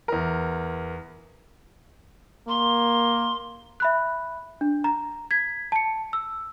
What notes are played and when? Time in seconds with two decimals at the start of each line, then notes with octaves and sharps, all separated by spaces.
0.08 E2 A#4
2.49 A#3 C6
3.80 E5 B5 F#6
4.61 D4
4.84 A#5
5.31 G#6 B6
5.72 A5 C#7
6.13 E6